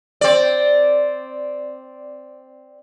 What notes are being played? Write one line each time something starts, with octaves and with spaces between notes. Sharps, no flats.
C4 D5